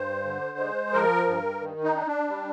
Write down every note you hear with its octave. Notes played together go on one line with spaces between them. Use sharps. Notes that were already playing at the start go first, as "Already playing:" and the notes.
Already playing: G2 C5
D3
G#3
F3 A#4
G2
D#3
D#4
D4
D4
G3